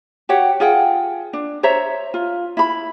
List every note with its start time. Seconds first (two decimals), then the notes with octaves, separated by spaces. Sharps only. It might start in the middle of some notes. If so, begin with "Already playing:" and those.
0.29 F#4 G4 C#5 F#5
0.60 F4 G#4 F#5 G5
1.33 D4
1.63 C5 C#5 E5 A#5
2.14 F4
2.57 E4 B5